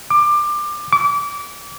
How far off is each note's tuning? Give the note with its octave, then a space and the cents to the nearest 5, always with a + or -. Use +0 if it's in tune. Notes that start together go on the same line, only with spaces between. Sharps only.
D6 +20
D6 -30